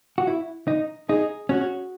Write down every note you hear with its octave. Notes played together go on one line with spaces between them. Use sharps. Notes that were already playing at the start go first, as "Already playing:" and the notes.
F#4
E4
D#4
D#4 G#4
C#4 F#4